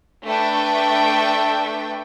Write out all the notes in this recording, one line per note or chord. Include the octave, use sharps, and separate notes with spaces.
A3 D4 B4 G5